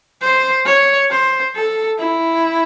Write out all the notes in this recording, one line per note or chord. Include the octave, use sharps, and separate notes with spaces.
C5
C#5
C5
A4
E4